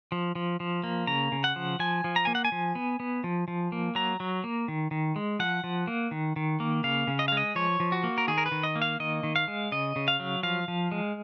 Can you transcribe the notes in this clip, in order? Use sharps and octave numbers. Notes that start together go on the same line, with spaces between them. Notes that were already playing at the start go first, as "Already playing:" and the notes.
F3
F3
F3
A#3
C#3 A#5
C#3
F#5
F3
F3 G#5
F3
A#5
A#3 G#5
F#5
G#5
F3
B3
B3
F3
F3
A#3
F#3 A#5
F#3
A#3
D#3
D#3
G#3
F3 F#5
F3
A#3
D#3
D#3
A#3
C#3 F5
C#3
D#5
F5
G#3
D#5
F3 C#5
F3
F#4
A#3
A#4
D#3 G#4
A#4
B4
D#3
D#5
A#3
F5
D#3 D#5
D#3
F5
G#3
C#3 D#5
C#3
F5
F#3
F3 F5
F3
G#3